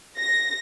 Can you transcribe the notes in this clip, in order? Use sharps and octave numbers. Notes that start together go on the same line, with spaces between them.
A#6